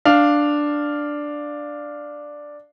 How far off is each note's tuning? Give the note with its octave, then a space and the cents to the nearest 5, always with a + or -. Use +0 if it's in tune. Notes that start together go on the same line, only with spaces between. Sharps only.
D4 +0 F5 +0